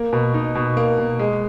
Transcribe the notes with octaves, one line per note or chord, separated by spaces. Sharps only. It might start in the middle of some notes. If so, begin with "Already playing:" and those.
Already playing: A#3
B2
D#4
B2
A#3
B2
G#3